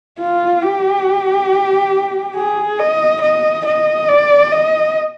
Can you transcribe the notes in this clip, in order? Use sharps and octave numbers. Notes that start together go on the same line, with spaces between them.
F4
G4
G#4
D#5
D#5
D#5
D5
D#5